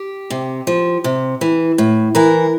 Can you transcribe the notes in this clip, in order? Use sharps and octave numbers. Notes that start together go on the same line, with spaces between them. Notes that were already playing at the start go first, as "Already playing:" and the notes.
Already playing: G4
C3
F3
C3
E3
A2
E3 A#4